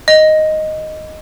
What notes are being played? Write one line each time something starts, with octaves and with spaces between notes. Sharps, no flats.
D#5